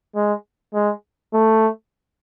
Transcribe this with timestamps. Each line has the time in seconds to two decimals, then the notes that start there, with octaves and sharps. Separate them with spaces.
0.16 G#3
0.74 G#3
1.33 A3